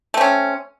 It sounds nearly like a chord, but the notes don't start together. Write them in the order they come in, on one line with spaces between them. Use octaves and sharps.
A3 C4 C#4